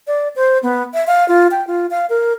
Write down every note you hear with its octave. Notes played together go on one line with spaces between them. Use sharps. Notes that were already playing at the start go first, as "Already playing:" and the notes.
D5
C5
B3
E5
F5
F4
G5
F4
F5
A#4